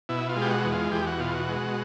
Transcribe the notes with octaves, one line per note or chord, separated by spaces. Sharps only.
B2 E4
F4
G#3
G4
F#4
E2
F4
E2 G4
F#4
B2 F4
F#4
G#3